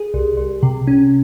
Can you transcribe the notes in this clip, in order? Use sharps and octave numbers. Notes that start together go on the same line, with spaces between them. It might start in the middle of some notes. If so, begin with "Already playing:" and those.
Already playing: G#4
C2
C2
C3
C#4